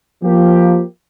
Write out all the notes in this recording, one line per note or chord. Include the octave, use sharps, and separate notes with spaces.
F3 A#3 G4